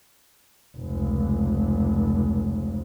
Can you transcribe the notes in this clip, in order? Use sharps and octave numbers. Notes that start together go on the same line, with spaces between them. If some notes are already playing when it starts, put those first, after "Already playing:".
F1 C#2